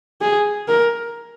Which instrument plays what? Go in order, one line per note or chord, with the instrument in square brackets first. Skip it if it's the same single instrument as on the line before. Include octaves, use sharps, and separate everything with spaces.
[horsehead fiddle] G#4
A#4